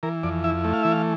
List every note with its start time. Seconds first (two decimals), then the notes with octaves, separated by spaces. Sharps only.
0.03 E3 A#4
0.23 F2 D5
0.44 E4 E5
0.64 A3
0.73 F5
0.83 E3 E5
0.92 F5